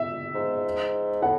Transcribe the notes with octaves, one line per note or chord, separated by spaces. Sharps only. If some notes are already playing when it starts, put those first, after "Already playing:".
Already playing: E5
G#2
A2 F#5